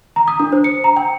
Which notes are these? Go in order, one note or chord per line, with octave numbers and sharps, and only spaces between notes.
A#5
D#6
D4
C5
C#7
A#5
G5